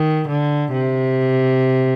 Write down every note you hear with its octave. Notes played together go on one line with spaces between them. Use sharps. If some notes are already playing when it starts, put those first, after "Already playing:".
Already playing: D#3
D3
C3